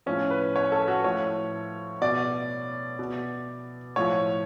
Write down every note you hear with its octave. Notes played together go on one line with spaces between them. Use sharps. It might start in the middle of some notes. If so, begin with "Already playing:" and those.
A2 F3 C#4
B4
C#5
A4
F#4
A2 F3 C#5
B2 D5
B2
A2 F3 C#5